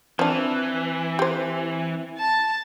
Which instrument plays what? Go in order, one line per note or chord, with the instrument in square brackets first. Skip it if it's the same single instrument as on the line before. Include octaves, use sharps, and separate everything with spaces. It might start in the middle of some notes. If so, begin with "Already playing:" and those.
[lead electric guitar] E3 [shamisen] F3 D4 [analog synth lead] C4
[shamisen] G4 C5
[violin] A5